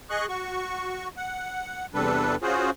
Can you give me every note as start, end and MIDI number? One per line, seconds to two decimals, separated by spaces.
0.10 0.26 68
0.10 0.26 75
0.10 0.26 85
0.10 0.26 90
0.29 1.08 66
0.29 1.08 85
1.17 1.86 78
1.94 2.36 40
1.94 2.36 48
1.94 2.36 55
1.94 2.36 62
1.94 2.36 69
1.94 2.36 71
2.42 2.70 61
2.42 2.70 65
2.42 2.70 66
2.42 2.70 68
2.42 2.70 72